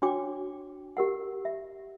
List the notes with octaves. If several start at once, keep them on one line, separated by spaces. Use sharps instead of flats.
D4 F#4 C#5 G5 D6
G4 A#4 F#5
E5